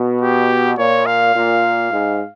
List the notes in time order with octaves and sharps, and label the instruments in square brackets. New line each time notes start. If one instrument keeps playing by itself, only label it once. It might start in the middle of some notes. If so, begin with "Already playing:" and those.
Already playing: [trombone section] B2
[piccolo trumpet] G4
[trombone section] A#2 [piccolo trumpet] C#5
[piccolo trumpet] F5
[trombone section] A#2
G#2